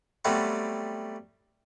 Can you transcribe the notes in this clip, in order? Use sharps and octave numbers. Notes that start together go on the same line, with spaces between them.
F#3 G3 A3 B3 C4